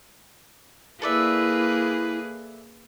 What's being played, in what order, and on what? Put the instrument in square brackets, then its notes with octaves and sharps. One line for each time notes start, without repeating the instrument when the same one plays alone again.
[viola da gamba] A#3 G#4 B4 [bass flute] E4 [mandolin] A4 D5 E5